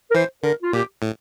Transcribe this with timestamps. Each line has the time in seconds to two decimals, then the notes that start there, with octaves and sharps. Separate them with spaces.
0.10 A#4
0.15 E3 C5
0.43 D3 A#4
0.62 F4
0.73 A#2 G4
1.02 A2